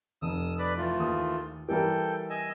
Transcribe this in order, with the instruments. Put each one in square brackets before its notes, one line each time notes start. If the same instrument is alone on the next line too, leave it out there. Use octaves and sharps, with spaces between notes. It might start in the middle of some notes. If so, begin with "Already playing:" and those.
[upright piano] F1 [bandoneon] D#6 E6
[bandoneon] B4 D5 B5
E3 A3 F4
[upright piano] D#2 D#6
[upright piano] E3 G3 A#4 [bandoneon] A4 G5
[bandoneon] D#5 G#5 E6